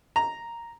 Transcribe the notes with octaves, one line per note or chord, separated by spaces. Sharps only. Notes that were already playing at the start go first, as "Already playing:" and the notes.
A#5